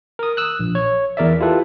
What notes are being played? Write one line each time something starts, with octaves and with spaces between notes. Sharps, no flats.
A#4 D#6
D#6 E6 F#6
A#1
C#5
E2 A#4 D5 E5
E4 F4 G4 A4 B4